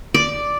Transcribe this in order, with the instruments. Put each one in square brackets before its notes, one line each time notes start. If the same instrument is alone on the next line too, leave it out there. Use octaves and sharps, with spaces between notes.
[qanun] D5